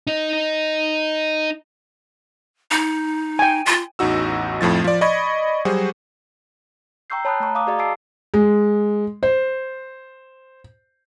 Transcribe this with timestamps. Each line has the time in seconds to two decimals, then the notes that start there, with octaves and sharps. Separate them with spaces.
0.07 D#4 D#5
2.71 D#4
3.39 G5 G#5
3.66 F4
3.99 A1 E2 D#4 F#4 E6
4.61 F2 A2 F3 A6
4.84 F3 D5
5.01 D5 D#5 B5 C#6 G#6
5.65 F#3 G3 F#4 G#4 C5
7.10 G5 A#5 C#6 E6 G6 C7
7.25 C#5 A5 B5 D#6 F#6
7.40 A3 A#5 C#6
7.55 F5 A#5 D6 D#6
7.67 F#4 G#4 D5 D#5 F5 C#6
7.79 D#5 A5 E6 C7 D7
8.34 G#3
9.23 C5